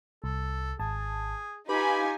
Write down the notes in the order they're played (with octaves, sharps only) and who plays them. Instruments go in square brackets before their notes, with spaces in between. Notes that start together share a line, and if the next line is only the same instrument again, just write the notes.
[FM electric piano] C2 [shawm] A4
[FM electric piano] G#1 A5 [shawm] G#4
[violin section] D#4 F4 G#5 [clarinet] G4 [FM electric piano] B4 [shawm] B5